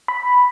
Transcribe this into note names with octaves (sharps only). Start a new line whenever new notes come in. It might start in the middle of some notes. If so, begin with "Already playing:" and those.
B5